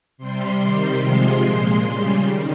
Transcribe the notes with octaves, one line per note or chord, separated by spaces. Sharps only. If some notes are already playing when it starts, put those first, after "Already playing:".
C3 G3 C6
C3 D#3 G3
C3 F3 G#3 C6
A#2 G#3
C#3 G3
D#3